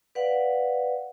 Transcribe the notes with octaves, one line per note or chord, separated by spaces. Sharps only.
B4 D5 F5 F#5